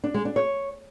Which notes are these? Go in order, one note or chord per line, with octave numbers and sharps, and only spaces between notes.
D4
G#3
D4
C#5